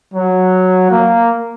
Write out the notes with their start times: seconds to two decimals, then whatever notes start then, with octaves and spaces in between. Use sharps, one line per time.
0.14 F#3
0.90 A#3